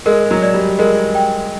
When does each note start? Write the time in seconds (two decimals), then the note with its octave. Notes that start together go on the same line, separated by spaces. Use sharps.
0.06 G#3 A#4
0.31 F#3
0.42 D5
0.54 G3
0.79 G#3 A#4
1.15 G5